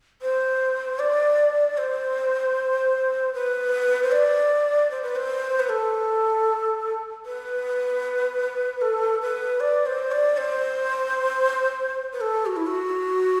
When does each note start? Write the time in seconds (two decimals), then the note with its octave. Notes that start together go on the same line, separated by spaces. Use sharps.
0.22 C5
0.99 D5
1.77 C5
3.34 B4
4.03 C5
4.12 D5
4.91 C5
5.02 B4
5.16 C5
5.59 B4
5.69 A4
7.26 B4
8.82 A4
9.21 B4
9.60 D5
9.86 C5
10.11 D5
10.37 C5
12.13 B4
12.21 A4
12.46 F#4
12.56 E4
12.66 F#4